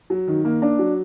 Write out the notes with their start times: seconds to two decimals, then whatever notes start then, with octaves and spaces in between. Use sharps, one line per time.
0.10 F#3
0.27 D#3
0.45 A#3
0.62 D4
0.79 F#3